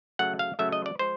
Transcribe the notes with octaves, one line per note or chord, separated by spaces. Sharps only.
C#3 F#3 A3 F#5
F5
C#3 F#3 A3 E5
D#5
D5
F3 G#3 C5